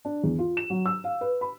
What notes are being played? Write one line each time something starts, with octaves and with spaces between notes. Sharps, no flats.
D4
E2
F4
E7
F#3
E6
F5
B4
B5